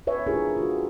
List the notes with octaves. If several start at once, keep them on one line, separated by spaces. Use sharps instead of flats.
B4 C#5 E5
D4 E4 F4 G4 G#4 A#4
F4 F#4